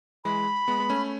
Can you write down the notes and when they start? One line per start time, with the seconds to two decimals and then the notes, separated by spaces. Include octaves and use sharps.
0.25 E3 G#3 B5
0.68 G#3 B3
0.80 B3
0.90 A3 C#4